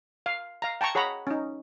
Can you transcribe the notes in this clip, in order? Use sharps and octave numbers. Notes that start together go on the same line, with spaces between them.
F5
F5 A#5
G5 A5 A#5 C#6
G#4 C#5 F#5 A#5 B5
C#4 D#4